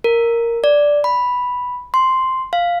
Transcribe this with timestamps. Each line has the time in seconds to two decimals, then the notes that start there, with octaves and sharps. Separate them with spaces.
0.04 A#4
0.64 D5
1.04 B5
1.94 C6
2.53 F5